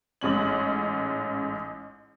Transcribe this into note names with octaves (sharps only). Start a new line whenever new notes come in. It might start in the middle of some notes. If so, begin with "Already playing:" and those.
A1 G#2 C#4 F#7